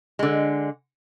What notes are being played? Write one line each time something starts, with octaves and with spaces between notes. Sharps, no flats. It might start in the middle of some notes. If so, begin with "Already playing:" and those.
D3 G#3